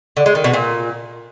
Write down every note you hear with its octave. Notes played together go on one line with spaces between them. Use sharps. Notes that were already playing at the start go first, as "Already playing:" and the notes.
D3
G#3
D#3
B2
A#2